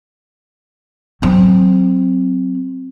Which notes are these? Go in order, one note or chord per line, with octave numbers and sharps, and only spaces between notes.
F#3 C4